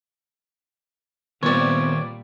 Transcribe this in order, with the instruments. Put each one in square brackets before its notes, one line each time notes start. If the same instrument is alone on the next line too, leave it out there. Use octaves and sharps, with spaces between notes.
[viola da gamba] A#2 G3 [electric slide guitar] D#3 F4 [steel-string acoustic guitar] B3 C4 [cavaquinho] C#5 D5